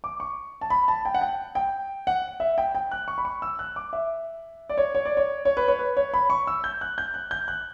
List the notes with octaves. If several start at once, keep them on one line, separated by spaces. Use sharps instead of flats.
D6
C#6
A5
B5
A5
G5
F#5
G5
G5
F#5
E5
G5
G5
F#6
C#6
B5
C#6
E6
F#6
D6
E5
D5
C#5
C#5
D5
C#5
C#5
B4
C#5
B4
C#5
B5
C#6
E6
G6
F#6
G6
F#6
G6
F#6